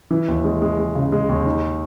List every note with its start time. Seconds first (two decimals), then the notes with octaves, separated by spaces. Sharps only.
0.11 E3
0.28 D#2
0.44 G#3
0.62 G#3
0.79 G#3
0.95 C#3
1.12 G#3
1.29 D#2
1.46 D#4